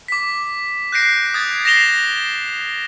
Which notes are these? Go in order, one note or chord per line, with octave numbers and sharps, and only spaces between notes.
D6 B6
F#6 G6 A#6 C7 D7
D#6 G#6 A6
A#6 C7 E7 F7 G7